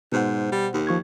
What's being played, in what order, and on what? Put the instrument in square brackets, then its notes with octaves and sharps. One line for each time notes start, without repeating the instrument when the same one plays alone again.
[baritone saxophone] G#2 [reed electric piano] B2 C5 F#5
[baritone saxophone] G3
D#2
[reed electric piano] F3 C#6 G#6